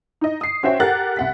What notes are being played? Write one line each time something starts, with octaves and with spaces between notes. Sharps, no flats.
D#4 D#5
D#6 C7
C#4 F#4 C5 E5 G5
G4 A4 A#4 F#5 F#6 A6
C2 F#5 B6